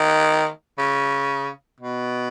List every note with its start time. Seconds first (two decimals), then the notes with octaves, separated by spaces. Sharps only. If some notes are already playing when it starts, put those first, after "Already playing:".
Already playing: D#3
0.78 C#3
1.80 B2